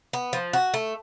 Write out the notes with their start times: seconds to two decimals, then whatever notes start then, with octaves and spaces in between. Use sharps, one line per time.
0.13 B3
0.33 F3
0.53 F#4
0.74 A3